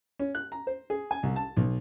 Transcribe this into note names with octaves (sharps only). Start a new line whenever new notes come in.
C#4
F#6
A#5
C5
G#4
G#5
C2
A5
B1